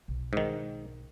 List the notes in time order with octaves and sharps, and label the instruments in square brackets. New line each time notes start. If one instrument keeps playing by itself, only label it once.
[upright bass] B1
[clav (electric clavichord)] G#2 D#3